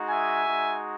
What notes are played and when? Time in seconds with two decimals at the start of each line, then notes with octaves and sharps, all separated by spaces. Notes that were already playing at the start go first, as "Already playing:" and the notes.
Already playing: G#3 D#4 F#4
0.09 E5 G#5
0.44 G#3 D#4 F#4